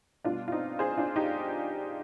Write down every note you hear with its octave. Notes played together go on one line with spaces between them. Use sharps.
B2 G3 B3 D4 F4
F4
C4 D#4
G#4 C5
D4 F4
D#4 G4